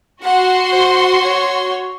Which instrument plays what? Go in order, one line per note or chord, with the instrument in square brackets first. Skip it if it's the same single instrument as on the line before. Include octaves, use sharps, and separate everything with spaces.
[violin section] F#4 C6 [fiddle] F#5
[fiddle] C5
C#5